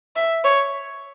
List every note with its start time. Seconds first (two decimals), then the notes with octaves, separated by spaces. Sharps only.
0.16 E5
0.45 C#5